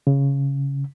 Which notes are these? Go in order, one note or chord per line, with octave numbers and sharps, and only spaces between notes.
C#3